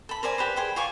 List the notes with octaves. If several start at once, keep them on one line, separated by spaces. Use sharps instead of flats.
A4 B5
A#4 C5 D5 G#5
G4 B4 C5
G#4 C5 G5
F4 G#5 C#6 D6